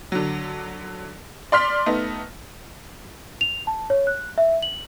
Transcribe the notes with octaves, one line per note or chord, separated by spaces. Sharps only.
D3 F#3
D5 C6 F6 B6
A3 B3 D#4
F7
A5
C#5
F#6
E5
F#7